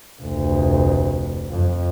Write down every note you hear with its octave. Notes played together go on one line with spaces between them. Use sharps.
F1 D2
F2